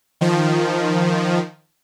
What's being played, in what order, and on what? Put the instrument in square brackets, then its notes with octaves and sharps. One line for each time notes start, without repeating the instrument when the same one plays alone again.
[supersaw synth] D#3 F3